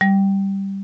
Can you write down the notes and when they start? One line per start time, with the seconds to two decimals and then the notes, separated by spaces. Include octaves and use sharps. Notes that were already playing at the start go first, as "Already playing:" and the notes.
0.01 G3